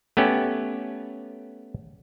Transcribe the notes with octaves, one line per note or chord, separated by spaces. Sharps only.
A3 B3 C#4 G4